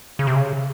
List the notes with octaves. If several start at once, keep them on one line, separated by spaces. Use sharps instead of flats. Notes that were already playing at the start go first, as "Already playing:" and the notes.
C#3
C3
C#3